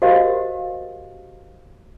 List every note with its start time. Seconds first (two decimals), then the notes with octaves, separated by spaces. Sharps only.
0.02 F#4 G4 A#4 C5 D#5 F5